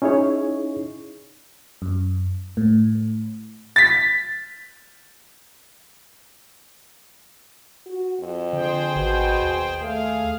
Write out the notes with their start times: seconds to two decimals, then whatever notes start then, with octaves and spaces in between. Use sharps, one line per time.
0.02 C#4 D#4 E4 G#4 C#5
1.82 F#2
2.57 A2
3.76 A6 B6
7.86 F#4
8.19 F2
8.53 D3 G#4 C5 G5
8.96 G#1 B2
9.42 D#2
9.82 A3 G#4 F5